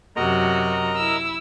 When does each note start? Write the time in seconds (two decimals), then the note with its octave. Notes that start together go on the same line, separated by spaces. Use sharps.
0.16 F#2 C3 F#4 A#4 D#5 A#5
0.96 E4 E6